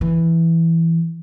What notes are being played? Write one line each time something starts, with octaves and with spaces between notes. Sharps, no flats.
E3